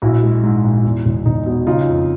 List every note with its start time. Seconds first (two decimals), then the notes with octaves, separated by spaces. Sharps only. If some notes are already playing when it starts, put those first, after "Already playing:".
0.02 A#1 E4 F#4
0.23 G#3
0.43 G#2
0.64 A#1
0.84 E2
1.05 E1
1.26 E1 D#4
1.46 B2
1.67 C#3 D#4 F4
1.87 F2